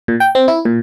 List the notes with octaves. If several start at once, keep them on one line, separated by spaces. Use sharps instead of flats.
A#2
G5
C4
E4
A#2